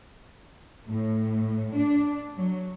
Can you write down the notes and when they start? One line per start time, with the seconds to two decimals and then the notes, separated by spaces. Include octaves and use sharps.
0.88 A2
1.76 D4
2.36 F#3